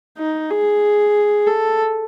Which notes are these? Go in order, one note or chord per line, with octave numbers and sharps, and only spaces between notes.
D#4
G#4
A4